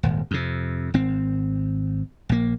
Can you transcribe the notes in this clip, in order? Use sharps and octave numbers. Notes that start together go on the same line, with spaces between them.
D#1 G#1
F2 C3
G#1 C4
A#1 A#3